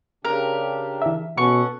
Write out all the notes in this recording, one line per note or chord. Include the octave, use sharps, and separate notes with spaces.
C#3 D4 G4 A#4
E3 E5
B2 C#4 A4 F#5 C#6